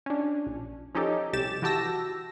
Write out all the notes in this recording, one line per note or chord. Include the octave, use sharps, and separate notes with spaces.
C#4 D4
A#1
F3 C#4 D#4 G4 A4
C2 C3 G4 A6 E7
E3 F#4 G4 A5 E6 A#6